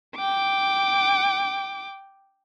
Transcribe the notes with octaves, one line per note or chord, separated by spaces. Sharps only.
G5 D6